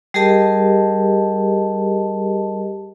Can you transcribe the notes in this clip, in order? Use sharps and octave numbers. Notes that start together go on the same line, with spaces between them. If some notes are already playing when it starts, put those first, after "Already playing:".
G3 G4 G#4 A#4 D#5 A5